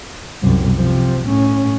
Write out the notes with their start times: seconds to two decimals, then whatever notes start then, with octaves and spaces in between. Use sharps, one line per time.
0.42 C2 F#2
0.77 C3 F3
1.27 A2 C#4